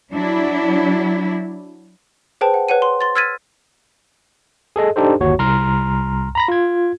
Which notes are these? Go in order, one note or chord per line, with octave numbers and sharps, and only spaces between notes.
F#3 D4 E4
G#4 B4 C5 G5 A5
F#5
B4 C#5 F#5 D#7
C6
C6 A6
E6 F6 G#6 A6 B6 D#7
G#4 A4 D#5
D4 D#4 G4 A4 C5
G1 D#2 F#4 C#5
C2 A#5 C6 F6
A#5 B5 A#6
F4 G#6